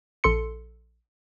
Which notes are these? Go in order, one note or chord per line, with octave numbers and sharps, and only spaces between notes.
A#1 A4 C6 C#7